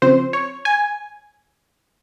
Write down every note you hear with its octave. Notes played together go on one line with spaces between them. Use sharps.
C#3 F3 C4 C5
C#5
G#5